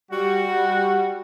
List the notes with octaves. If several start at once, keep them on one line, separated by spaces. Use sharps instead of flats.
G3 F#4